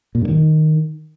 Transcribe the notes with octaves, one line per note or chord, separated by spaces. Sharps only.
A#2
G2
D#3